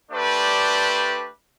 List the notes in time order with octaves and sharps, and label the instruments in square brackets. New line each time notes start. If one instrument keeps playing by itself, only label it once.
[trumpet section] A3 D4 G4 B4 C5 D5